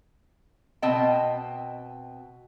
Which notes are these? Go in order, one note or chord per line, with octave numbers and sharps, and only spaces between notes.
B2 C4 D#5 G5 A5